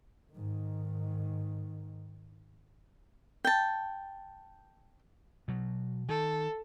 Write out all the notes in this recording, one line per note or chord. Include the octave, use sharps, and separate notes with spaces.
G#2 D#3
G5 A5
B2 F#3
D#3 A4